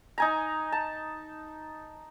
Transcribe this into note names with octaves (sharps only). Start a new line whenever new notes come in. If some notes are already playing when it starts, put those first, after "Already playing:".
D#4 G#5 A#5
A5